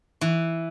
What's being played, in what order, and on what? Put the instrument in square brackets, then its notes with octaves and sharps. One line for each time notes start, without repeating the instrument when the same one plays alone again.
[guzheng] E3